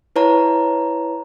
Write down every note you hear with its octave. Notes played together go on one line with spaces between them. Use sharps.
E4 B4 C#5 A5 A#5